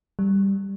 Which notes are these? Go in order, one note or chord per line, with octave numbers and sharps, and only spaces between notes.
G3